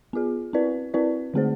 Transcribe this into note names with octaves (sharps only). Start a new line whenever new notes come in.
B3 F4 G#4
C4 E4 B4 D5
C4 E4 B4 D5
D3 A3 C4 G#4 C5